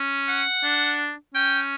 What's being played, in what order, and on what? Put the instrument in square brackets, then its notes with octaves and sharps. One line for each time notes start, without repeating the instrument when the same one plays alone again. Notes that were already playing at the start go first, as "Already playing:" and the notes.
Already playing: [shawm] C#4
[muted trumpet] F#5
[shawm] D4
[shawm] C#4 [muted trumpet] G5